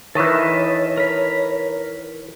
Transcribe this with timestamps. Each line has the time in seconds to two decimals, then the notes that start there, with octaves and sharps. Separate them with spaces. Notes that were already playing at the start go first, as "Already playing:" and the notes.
0.15 D#3 E3 A4 C#5 D#5 E5
0.97 A#4 B5